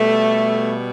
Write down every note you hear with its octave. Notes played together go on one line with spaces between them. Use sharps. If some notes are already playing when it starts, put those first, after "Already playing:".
Already playing: B2 G3 A3